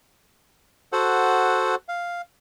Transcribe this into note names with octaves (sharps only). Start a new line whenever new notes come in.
F#4 A4 C5 F#5
F5